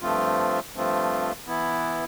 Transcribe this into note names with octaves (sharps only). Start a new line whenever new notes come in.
G2 F3 A3 C4 F4
G2 F3 A3 C4 F4
E3 B3 E4